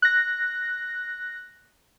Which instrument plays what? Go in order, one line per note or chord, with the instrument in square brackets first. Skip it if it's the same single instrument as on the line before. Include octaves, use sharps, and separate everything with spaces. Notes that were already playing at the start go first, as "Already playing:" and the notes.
[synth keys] F#6 A#6